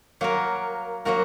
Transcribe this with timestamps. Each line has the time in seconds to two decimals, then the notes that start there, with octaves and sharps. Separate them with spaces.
0.21 F#3 A#3 F#4 A#4
1.05 F#3 A#3 F#4 A#4